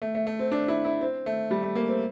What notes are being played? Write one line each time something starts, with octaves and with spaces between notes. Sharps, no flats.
A3
A3
A3
C4
D4
E4
E4
C4
A3
G3
A3
A#3
C4